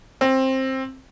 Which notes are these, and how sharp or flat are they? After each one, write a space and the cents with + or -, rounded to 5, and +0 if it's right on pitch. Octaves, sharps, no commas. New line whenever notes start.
C4 +15